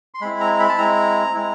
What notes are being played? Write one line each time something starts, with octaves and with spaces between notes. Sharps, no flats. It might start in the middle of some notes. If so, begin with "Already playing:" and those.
C6
G#3 C4 E4 B5
A#5
B5
A5
G#3 C4 E4 A#5
G#3 C4 E4